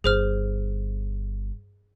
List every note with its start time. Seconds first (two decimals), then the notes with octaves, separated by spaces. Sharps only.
0.04 G1 G#4 C5 F6